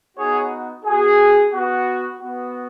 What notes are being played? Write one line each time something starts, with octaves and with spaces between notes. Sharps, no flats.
B3 D#4 F#4 G#4 C#5
B3 F#4 G#4
B3 F#4
B3 F#4